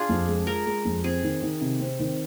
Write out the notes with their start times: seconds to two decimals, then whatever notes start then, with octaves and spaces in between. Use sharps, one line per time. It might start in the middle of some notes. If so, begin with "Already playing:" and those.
Already playing: D4 F4 G#4
0.09 F2
0.28 G#3
0.47 G#3 A#4
0.66 G#3
0.85 F2
1.04 C4 G#4
1.23 D#3
1.42 D#3
1.61 C3
1.80 C4
1.99 D#3